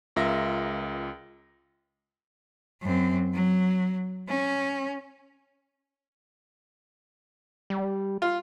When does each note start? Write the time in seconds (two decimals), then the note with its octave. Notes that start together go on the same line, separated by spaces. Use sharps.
0.16 C#2 F4 A#4 E5 A#6
2.82 F#2 C4
3.34 F#3
4.28 C#4
7.70 G3
8.22 F4